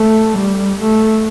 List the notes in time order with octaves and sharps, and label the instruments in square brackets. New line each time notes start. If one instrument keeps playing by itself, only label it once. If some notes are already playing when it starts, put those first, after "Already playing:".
Already playing: [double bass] A3
G3
A3